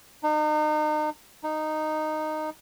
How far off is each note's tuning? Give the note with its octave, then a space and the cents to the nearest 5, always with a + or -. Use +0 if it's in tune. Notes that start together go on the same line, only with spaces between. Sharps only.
D#4 -35
D#4 -10